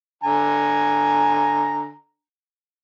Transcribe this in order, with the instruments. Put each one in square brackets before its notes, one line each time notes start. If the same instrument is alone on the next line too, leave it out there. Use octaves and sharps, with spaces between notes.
[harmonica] D3 G#5 A#5